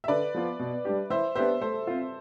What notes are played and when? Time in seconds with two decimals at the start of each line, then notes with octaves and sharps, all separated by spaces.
0.04 E5
0.08 D3 B4 D5
0.34 F3 B3 F4
0.59 B2
0.85 G3 D4 G4
1.10 E3 C5 E5
1.35 B3 D4 G4 B4 C5 E5
1.61 A3 A4 C5
1.87 C4 F4